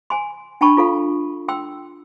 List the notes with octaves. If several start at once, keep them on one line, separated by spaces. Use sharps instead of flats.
G#5 C6
D4 G5 A5 B5 C#6
F4 A4 F5
G5 C6 E6